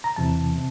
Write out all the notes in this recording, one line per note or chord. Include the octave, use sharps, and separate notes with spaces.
A#5
E2 C3 E3 A5
C3